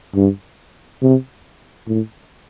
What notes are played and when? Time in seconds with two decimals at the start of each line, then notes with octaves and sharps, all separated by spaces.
0.15 G2
1.02 C3
1.87 A2